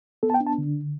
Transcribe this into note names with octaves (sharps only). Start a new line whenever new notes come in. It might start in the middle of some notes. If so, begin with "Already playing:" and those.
B3 A4
A5
G5
D4
A5
D3